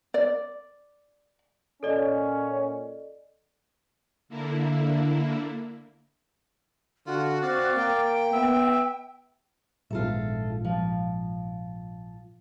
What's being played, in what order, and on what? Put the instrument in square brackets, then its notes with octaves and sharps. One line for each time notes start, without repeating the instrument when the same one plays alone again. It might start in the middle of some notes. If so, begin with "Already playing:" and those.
[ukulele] D5
[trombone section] A#2 C#4 [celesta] A4 D5 D#5
[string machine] D3 A#3 E4
[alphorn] D3 [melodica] F4 [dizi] F#4
[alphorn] C4 [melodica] D5 F5
[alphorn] A#3 [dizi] G5
[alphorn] B3 [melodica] E5
[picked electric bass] A#1 G#2 [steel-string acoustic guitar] F4 A4 E5
[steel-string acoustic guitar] F3